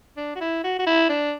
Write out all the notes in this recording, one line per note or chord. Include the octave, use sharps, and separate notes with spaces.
D4
F#4
E4
F#4
F#4
E4
D4